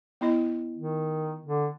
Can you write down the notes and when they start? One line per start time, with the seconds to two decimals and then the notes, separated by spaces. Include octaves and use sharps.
0.21 B3 E4 D#5
0.77 D#3
1.46 D3